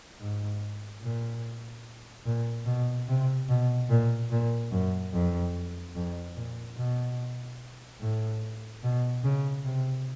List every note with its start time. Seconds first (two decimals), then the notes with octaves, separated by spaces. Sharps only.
0.20 G#2
1.02 A#2
2.26 A#2
2.66 B2
3.08 C3
3.49 B2
3.90 A#2
4.31 A#2
4.72 F#2
5.13 F2
5.95 F2
6.37 A#2
6.78 B2
8.01 A2
8.83 B2
9.24 C#3
9.65 C3